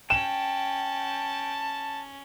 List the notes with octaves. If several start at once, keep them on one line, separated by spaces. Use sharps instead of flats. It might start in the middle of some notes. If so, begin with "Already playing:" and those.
C#4 G5 A5 E7